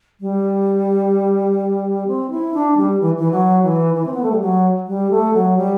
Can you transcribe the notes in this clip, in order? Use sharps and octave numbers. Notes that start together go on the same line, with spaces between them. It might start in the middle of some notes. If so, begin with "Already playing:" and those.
G3
C4
E4
D4
G3
E3
E3
F#3
E3
E3
C4
B3
A3
G3
F#3
G3
A3
F#3
G3